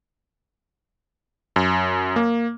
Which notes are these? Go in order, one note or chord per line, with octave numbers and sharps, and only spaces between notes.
F#2
A#3